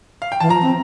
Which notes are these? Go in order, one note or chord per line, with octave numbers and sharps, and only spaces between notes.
F5
G5
E3 A5
F3 A#5
C4